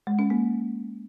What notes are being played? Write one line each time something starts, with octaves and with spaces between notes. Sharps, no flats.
G#3
C#4
A#3